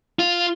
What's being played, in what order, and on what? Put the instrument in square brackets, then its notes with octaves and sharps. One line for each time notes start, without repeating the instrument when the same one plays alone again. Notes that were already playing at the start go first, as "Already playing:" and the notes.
[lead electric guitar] F4